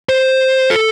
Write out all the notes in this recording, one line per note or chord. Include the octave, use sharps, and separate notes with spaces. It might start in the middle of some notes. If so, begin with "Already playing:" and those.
C5
A4